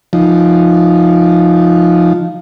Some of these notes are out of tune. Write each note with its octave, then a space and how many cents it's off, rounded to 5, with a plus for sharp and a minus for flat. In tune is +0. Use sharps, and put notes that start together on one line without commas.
F3 +0 D#4 +0